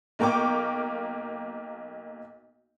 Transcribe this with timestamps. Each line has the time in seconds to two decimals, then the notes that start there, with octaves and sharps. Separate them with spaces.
0.19 B1 A#3 A#4 G5 C#6 D6